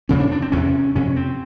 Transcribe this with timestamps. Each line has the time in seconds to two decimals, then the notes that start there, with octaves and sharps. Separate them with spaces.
0.09 F2 C#3 C#4
0.20 D4
0.32 D4
0.42 C4
0.52 E2 C3 C#4
0.95 F2 C3 C#4
1.16 C4